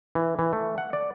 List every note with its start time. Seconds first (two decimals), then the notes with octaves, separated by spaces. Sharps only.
0.15 E3
0.39 E3
0.53 A3
0.78 F#5
0.93 D5